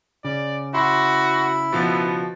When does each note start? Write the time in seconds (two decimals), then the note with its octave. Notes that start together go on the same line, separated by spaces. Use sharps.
0.24 C#3 D5
0.74 E4 F#4 C6
1.72 B2 F3 B3 A6